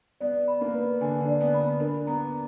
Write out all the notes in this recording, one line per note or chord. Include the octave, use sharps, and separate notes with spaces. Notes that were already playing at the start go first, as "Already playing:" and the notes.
B3 D5
B5
A#3
B4
D3 G#5
D3
D5
B3
B5
B3
D4 A#4
B3 A#5